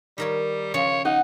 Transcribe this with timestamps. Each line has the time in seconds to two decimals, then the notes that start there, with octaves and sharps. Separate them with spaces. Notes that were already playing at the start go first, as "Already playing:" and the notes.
0.18 D#3 G3 A#4 C#5
0.74 C#3 F3 C#4 C#5
1.05 D#4 F#5